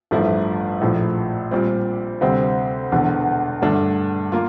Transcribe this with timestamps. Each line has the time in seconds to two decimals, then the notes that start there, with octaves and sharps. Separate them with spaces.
0.11 A1 G2 F3 A3 E4
0.81 A#1 A2 F3
1.51 A#2 G3 C4
2.21 D2 C3 G3 C4
2.92 E1 E2 D3
3.62 G2 D3 A3 D4
4.32 A#3 F4